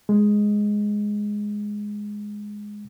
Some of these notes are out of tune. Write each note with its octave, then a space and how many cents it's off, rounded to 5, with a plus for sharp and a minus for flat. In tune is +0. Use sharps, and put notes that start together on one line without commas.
G#3 +0